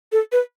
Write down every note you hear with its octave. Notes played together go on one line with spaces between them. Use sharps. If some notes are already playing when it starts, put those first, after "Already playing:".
A4
B4